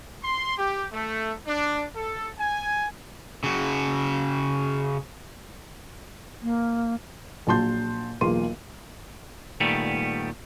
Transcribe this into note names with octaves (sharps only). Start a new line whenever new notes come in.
C6
G4
A3
D4
A4
G#5
C#3 F#4
A#3
A#1 F#3 A5 C6 G6
B1 E2 A#3 F4 C6 D#7
A#2 D#3 G3 A3 B3